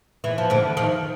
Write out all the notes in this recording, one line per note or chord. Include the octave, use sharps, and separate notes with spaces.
E3
F3
D3 E3
D#3 F3